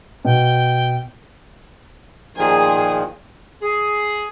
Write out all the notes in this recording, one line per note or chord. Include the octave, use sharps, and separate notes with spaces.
B2 G5
A#2 D#3 F3 G#4
G#4